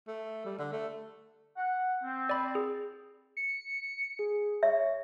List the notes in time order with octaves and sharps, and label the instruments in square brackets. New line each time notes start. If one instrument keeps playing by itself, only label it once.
[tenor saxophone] A3
G3
D3
A3
[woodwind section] F#5
C4
[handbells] D5 B5
G#4
[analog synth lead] C#7
G#4
[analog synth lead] C#5 [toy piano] E5